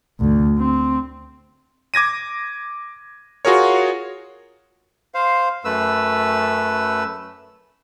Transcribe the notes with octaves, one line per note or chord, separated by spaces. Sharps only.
D2
C4
D6 G#6 A#6 D#7
F4 F#4 G#4 A#4 C#5
C5 F5
F#2 A3 B4 E6